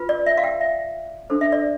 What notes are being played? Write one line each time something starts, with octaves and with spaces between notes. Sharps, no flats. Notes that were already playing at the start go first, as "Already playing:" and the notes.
Already playing: F4 B4
D5
E5
F5
G5
E5
D4 A4 C5
E5
D5